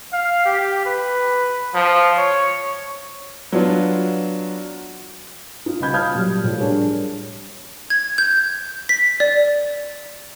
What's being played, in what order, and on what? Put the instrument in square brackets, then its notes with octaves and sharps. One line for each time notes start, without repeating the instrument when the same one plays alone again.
[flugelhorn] F5
G4
B4
F3
C#5
[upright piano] F#3 B3 D4 F4
[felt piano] D#4 F4
C#2 G3 D#5 B5 G6 G#6
F5 A5 D#6 F6 G6 G#6
A#2 F#3 G3
A2 F3 G3
G3 D4 G#4 A#4 C#5
[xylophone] G#6
G6
B6
D5